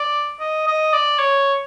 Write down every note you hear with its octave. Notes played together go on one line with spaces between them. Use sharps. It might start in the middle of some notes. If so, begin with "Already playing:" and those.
Already playing: D5
D#5
D#5
D5
C#5